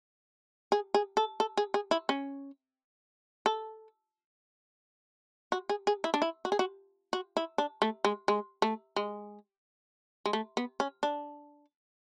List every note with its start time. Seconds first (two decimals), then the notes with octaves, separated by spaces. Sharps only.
0.72 G#4
0.94 G#4
1.17 A4
1.40 A4
1.57 G#4
1.74 G#4
1.91 E4
2.09 C#4
3.46 A4
5.52 F#4
5.69 G#4
5.87 G#4
6.04 E4
6.14 D4
6.22 E4
6.45 F#4
6.52 G#4
6.59 F#4
7.13 F#4
7.37 E4
7.58 D4
7.82 A3
8.05 G#3
8.28 G#3
8.62 A3
8.96 G#3
10.26 G#3
10.33 A3
10.57 B3
10.80 C#4
11.03 D4